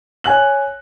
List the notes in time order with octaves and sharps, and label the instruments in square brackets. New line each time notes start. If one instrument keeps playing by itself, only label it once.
[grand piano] C#5 G#5 F#6 F#7